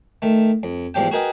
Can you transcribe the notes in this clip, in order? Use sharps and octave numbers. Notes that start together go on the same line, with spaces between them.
D#3 A3
F2
E2 G#2 F3 G4 G5
F#4 G#4 A#4 B4 D#5 G5